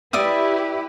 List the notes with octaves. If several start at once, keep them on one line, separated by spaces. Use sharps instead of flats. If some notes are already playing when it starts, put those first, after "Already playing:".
E4 G4 B4 D5 E5 D#6